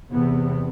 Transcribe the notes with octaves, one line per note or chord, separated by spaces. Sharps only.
E2 C3 B3